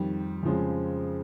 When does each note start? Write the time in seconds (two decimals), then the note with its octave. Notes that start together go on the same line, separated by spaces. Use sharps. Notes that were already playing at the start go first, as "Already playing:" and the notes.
Already playing: F2 D#3 G3
0.43 F2 C#3 F3 G#3